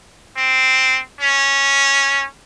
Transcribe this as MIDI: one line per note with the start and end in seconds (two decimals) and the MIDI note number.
0.37 0.98 60
1.20 2.25 61